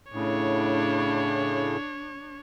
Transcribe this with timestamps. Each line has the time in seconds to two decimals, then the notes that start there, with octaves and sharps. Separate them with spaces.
0.12 A2 C#3 D4 C#5